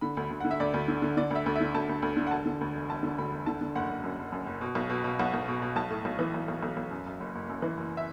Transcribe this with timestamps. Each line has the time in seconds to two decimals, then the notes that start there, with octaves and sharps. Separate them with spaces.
0.01 D3 B5
0.17 D2 B5
0.30 D2
0.40 D3 F#5
0.51 E5
0.60 D2 D5
0.74 D2
0.88 D3
1.02 D3
1.17 D3 D5
1.31 D2 E5
1.46 D2
1.56 E5
1.61 D3
1.74 D2 A5
1.89 D2
2.02 D2
2.17 D3
2.27 F#5
2.31 E1 A5
2.46 D3
2.61 D2
2.74 E1
2.89 E1 A5
3.03 D3
3.18 D2 B5
3.32 E1
3.46 D3 A5
3.61 D3
3.75 F#1 F#5
3.89 F#1
4.04 F#2
4.19 F#1
4.32 F#2
4.46 F#1
4.61 B2
4.75 B1
4.90 B2
5.04 B2
5.19 B1 F#5
5.34 B1
5.48 B2
5.62 B2
5.76 B1 A5
5.90 A2
6.05 B1
6.19 E3
6.34 B1
6.48 B1
6.63 B1
6.77 B1
6.91 F#2
7.06 F#2
7.20 F#1
7.35 F#1
7.49 F#2
7.62 E3
7.77 F#1
7.97 E5